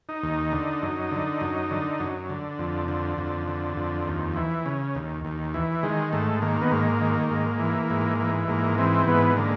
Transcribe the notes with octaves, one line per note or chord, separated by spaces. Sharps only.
D#4
D#2
D3
F#2
D3
F#2
D3
F#2
D3
F2
D3
F2
D3
F2
D#2
E3
C#3
D#2
D#2
E3
D#3 G#3
G#2 A3
D#3 A#3
B3
G#2 A#3
D#3
G#2
E3
G#2
E3
G#2 A#3
E3 C4
G#2 B3
D3 A#3